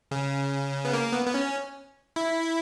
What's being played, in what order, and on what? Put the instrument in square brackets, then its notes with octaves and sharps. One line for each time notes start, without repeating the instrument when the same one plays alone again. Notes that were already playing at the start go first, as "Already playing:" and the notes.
[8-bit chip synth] C#3
B3
A#3
B3
B3
C#4
E4